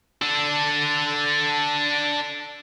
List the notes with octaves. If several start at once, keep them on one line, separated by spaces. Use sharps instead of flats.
D4 A4